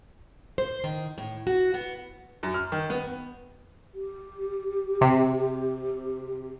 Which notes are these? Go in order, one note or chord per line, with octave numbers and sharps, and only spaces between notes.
C5
D#3
A2
F#4
B3
F#2
F6
D#3
B3
G4
C3